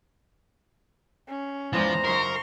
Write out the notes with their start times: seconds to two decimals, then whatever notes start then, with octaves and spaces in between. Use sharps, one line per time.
1.28 C#4
1.73 E2 G#2 F3 C5 D5 A#5
2.04 F#2 C#3 D#4 A#4 C6 C#6